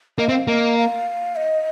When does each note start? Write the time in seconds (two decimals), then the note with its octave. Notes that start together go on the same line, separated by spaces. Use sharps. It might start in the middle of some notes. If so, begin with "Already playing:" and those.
0.18 A#3 D#5
0.29 C4
0.32 F5
0.46 A#3 D#5 F5
0.78 F5
1.36 D#5